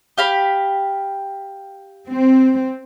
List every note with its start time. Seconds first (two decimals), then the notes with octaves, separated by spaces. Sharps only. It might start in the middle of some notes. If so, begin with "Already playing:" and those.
0.18 G4 F5 B5
2.08 C4